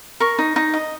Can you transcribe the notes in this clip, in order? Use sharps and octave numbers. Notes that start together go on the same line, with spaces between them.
A#4 C#6
D#4
D#4
D#5